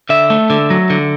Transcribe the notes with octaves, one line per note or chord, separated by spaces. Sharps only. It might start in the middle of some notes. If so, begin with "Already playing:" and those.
D3 E5
A3
D3
F#3
D3